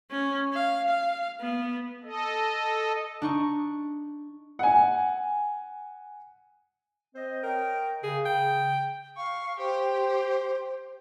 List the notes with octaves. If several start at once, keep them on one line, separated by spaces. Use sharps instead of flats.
C#4
F5
F5
B3
A4 D#5
D4 D#4 C#6
F#5 G#5
C4 C5 D#5
A#4 C#5 D#5 G5
C#3 G#4
G5
F5 C#6
G4 C5